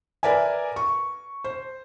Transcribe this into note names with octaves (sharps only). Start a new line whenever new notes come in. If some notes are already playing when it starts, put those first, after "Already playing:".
A#4 B4 D5 E5 G#5
C#6
C5